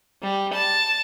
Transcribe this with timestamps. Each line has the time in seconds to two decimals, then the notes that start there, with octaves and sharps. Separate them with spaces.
0.23 G3
0.53 A5